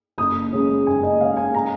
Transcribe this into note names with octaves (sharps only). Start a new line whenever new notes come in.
F#1 D#6
F#2 C#3 G#3 C#4
F#1 G#5
D#5
F#2 C#3 G#3 C#4 F5
G#5
A#5